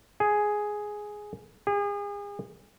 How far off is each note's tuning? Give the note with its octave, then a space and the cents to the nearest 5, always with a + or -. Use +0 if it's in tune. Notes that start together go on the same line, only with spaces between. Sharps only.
G#4 +5
G#4 -35